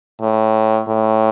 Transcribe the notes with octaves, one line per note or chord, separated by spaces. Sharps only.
A2
A2